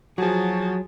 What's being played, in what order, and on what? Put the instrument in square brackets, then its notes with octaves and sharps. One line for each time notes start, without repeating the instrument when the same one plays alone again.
[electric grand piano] F3 F#4 [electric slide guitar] F#3 [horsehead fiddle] G#4 A5